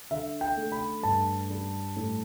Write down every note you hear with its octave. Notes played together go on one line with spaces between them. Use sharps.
D3 E5
G5
A3
B5
G2 A5
G3
A2